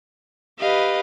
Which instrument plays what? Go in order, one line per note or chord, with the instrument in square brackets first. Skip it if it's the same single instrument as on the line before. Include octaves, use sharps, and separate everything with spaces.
[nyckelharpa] G4 B4 [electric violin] D#5 F5